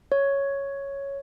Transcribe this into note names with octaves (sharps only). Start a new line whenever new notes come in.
C#5